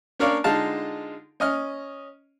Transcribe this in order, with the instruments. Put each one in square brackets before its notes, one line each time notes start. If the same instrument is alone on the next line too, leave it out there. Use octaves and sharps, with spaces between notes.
[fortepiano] C#4 D4 A#4 C#5 D5 F5
D3 G#3 D#4 F4 F5 A5
C#4 D#5 F6